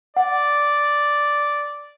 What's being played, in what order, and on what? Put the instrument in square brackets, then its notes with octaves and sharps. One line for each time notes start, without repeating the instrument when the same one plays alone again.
[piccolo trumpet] D5 [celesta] F#5